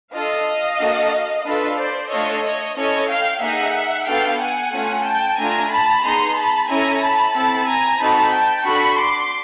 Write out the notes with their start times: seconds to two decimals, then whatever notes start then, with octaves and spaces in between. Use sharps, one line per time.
0.13 D4 F4 A4 D#5 F5
0.79 A#3 D4 F#4 A4
1.44 D4 F4 A4 B4
1.77 C5 D5
2.10 A3 D4 F4 A4 C#5 D#5
2.42 C#5 D#5
2.75 C#4 E4 A4 C#5 D#5
3.08 F5 G5
3.41 A#3 D#4 G#4 E5 F#5
4.06 B3 D4 F#4 A4 F5 G5
4.39 F#5 G#5
4.71 A3 C#4 F4
5.05 G5 A5
5.37 A3 D4 F4 G#5 A#5
5.70 A5 B5
6.03 B3 D#4 G#4 A#5 C6
6.35 A5 B5
6.68 C#4 E4 A4 G#5 A#5
7.00 A5 B5
7.33 C4 E4 A4 A5 B5
7.66 G#5 A#5
7.98 C4 D#4 F#4 A4 A5 B5
8.31 G5 A5
8.64 D4 F#4 A4 B5 C#6
8.97 C6 D6